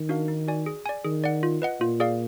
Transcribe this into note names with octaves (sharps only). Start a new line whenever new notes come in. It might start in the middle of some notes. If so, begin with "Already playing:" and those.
Already playing: D#3
D4 F#4 A#4 F5
D#4
F#4 D5 G#5
G#4
D5 G#5
D#3 G#4
D5 F#5
F4
B4 D#5 F#5
A#2 F4
G#4 D5 F5